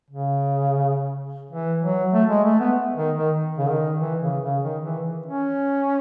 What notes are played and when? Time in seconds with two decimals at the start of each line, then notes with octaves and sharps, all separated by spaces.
0.10 C#3
1.51 E3
1.82 F#3
2.13 A3
2.29 G#3
2.44 A3
2.60 B3
2.96 D#3
3.17 D#3
3.58 C#3
3.70 D#3
4.00 E3
4.22 C#3
4.42 C#3
4.63 D#3
4.84 E3
5.26 C#4